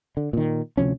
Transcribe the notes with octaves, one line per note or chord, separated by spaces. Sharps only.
D3
A#2 D#3
D2 C3 F3 C#4